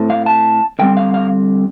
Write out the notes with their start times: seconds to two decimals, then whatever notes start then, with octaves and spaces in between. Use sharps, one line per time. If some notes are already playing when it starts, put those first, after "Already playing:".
Already playing: A2 A3 C4
0.10 F5
0.26 A5
0.79 D3 G3 C4 G5
0.97 F5
1.14 F5